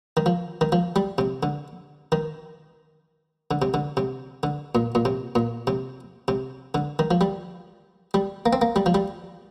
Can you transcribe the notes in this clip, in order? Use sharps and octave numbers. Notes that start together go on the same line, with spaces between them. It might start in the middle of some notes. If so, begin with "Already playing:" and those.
D#3
F3
D#3
F3
G3
C3
D3
D#3
D3
C3
D3
C3
D3
A#2
A#2
C3
A#2
C3
C3
D3
D#3
F3
G3
G3
A#3
C4
A#3
G3
F3
G3